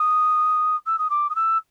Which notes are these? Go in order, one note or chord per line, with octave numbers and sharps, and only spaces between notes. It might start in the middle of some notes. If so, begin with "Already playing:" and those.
Already playing: D#6
E6
D#6
D6
D#6
E6